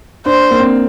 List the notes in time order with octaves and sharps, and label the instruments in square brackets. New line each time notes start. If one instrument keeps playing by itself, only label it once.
[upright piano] D4 [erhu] C5
[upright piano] A#3
C4